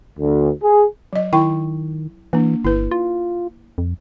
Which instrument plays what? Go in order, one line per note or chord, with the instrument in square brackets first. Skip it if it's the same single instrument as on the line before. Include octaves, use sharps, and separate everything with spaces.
[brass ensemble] D2
G#4
[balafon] F#3 D#5
[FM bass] D#3 [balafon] E4 G5 C#6
[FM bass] E3 [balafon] A#3 D4
[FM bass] G1 [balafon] E4 B4
[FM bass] F4
F2